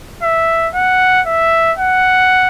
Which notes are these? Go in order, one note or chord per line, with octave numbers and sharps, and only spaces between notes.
E5
F#5
E5
F#5